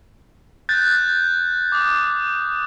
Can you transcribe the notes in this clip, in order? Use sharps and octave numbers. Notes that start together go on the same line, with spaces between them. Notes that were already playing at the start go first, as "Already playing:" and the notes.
F#6 G6 A6
D6 D#6